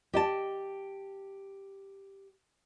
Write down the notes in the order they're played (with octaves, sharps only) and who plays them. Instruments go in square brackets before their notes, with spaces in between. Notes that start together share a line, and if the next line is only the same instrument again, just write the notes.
[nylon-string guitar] G4 D#5 A5